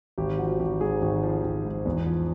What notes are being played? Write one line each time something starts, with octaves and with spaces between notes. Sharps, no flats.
G#1 G4
F3 F#4
G#1 G4
G#2 G#4
G#1
F3
G#1
G#2
E2
F3